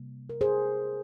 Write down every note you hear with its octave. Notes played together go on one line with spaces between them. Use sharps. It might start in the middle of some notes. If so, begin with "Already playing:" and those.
Already playing: C3 G3 A#3
A#4
G#4 C5